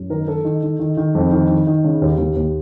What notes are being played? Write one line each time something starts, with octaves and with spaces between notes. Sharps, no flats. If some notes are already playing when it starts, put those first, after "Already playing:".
Already playing: F#2
D#3 A#4
D#3 A4
D#3
D#3
D#3
D#3
F2
D#3
D#3
D#3
C#3
D#2
D#2
D#2